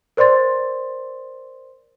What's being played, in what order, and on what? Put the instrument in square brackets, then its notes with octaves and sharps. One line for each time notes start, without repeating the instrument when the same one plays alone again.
[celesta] A#4 C5 D5 C6 A6